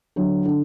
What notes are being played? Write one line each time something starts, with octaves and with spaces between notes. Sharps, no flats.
D3 F#3
D3